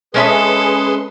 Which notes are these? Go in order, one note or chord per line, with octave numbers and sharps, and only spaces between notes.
G#3 C#4 G#4 A4 B4 E5 C6